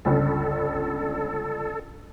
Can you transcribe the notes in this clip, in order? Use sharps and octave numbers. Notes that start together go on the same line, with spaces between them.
G1 C#2 A4